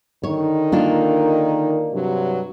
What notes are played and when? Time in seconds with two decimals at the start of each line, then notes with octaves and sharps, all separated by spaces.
0.23 D3 D#3 D#4 C#5
0.72 A#3 D4 F4
1.93 G2 C3 F#3